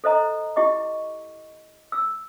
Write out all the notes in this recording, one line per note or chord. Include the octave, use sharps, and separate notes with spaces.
A4 C5 D#5 A#5
E4 G4 D#5 C#6 D6
E6